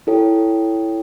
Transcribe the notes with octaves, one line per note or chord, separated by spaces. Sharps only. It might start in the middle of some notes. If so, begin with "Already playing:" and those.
E4 A4 C#5 G5